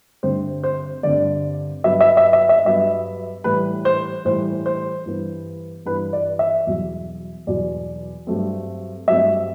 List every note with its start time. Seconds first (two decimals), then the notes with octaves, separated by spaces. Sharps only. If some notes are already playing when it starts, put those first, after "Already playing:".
0.23 G2 D3 A3 C4 C5
0.64 C5
1.03 G2 D3 A3 C4 D5
1.84 G2 F#3 B3 E5
2.00 E5
2.17 E5
2.33 E5
2.49 E5
2.65 G2 F#3 B3 E5
3.44 A2 E3 G3 B4
3.85 C5
4.25 A2 E3 G3 C5
4.66 C5
5.06 G2 E3 B3
5.86 G2 E3 B3 B4
6.13 D5
6.39 E5
6.67 E2 B2 F#3
7.47 E2 B2 F#3 D5
8.27 G2 F#3 A3 C4
9.08 G2 F#3 A3 C4 E5